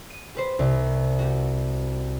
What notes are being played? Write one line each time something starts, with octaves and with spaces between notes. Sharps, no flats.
D#7
G4 B4 C5
C2
F#4 G4